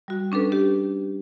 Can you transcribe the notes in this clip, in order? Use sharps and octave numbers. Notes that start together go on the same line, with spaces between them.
G3 F#4
C#4 D4 A4 B4
G4